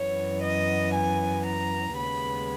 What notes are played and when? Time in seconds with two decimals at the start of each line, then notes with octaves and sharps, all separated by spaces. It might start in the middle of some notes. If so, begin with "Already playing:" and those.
Already playing: F#2 E3 B3 C#5
0.43 D#5
0.94 G#5
1.45 A#5
1.96 D#2 C#3 G#3 B3 B5